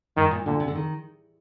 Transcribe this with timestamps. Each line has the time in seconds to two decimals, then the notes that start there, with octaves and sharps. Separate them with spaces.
0.17 G2 D#3
0.31 A#2
0.46 A#2 D3
0.60 C3
0.68 D3
0.75 D#3